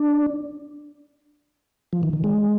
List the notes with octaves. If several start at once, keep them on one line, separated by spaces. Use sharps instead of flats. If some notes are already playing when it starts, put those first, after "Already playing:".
Already playing: D4
F3
D#3
D#3
G#3